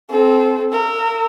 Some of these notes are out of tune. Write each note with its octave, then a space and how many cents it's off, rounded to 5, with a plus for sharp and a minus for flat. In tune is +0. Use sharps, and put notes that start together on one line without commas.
C4 +0 A4 -30
A#4 -25 E6 +0